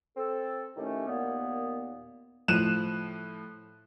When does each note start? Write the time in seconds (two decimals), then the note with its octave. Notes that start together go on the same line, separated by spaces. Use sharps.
0.16 C4 A4
0.76 A2 D#3 A3 C#4 G4
1.07 D#2 A#2 A#3 B3
2.48 A2 F3 F#6 D#7 E7